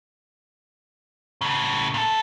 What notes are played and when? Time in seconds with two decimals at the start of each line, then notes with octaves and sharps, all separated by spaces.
1.41 A2 C#3
1.94 A#2 A4